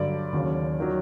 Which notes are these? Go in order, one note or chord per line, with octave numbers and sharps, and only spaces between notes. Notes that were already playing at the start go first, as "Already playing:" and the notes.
Already playing: G2 D3 F#3 D5
D#2 C#3 F#3
D#3 F#3